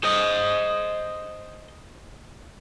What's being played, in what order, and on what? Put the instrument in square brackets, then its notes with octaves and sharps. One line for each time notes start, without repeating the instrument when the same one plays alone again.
[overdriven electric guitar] C5 D#5